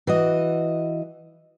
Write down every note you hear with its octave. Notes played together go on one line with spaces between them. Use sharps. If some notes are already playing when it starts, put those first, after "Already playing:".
E3 F#4 D#5